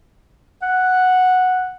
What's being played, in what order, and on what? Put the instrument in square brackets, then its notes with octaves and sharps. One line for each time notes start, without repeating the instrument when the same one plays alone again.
[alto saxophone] F#5